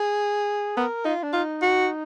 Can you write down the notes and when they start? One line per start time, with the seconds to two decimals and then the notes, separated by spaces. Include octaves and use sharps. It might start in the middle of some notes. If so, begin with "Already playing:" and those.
Already playing: G#4
0.77 B3 A#4
1.05 D#4 F4
1.23 D4
1.33 D#4 F4
1.62 F#4